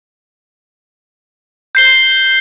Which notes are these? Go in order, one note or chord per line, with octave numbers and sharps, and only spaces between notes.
G6 C7 G7